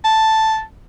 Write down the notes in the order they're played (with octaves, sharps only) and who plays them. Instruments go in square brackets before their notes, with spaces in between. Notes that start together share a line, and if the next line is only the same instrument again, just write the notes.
[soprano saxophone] A5